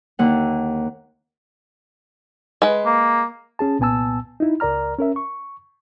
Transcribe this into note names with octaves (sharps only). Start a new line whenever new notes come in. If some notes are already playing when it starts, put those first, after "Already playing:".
D#2 D3 A#3 F#5
G#3 B4
A#3
C#4 G#4 A5
C2 A#2 B3 G#5 A5 E6
D#4 E4
C#2 A#4 D5 A#5 F6
C#4 A#4 E5
C#6